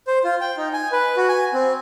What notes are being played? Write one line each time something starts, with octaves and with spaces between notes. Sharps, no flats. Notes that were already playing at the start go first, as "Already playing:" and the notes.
C5
F4
G5
D#4
G#5
B4
F#4
G#5
C4